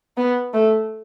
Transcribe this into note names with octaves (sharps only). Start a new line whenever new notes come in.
B3
A3